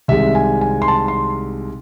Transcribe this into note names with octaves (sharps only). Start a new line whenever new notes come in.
C2 C3 D#3 G#3 C4 E5
G#5
G#5
C6
A5
C6